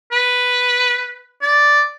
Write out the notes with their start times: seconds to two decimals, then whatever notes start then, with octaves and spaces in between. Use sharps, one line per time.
0.12 B4
1.42 D5